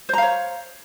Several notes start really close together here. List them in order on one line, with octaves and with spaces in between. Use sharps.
C5 A#5 F5 C#5